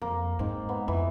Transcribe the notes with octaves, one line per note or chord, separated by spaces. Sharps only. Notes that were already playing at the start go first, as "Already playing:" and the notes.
F2 A#3
G#2 C4 D#4
B3
F2 E3